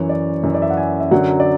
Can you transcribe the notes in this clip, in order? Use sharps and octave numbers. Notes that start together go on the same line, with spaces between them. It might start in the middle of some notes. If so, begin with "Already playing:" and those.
Already playing: F#2 E3 C#5
D5
F#2 E3
D5
E5
F#5
G#5
E5
F#2 D3 F#3 F#5
D5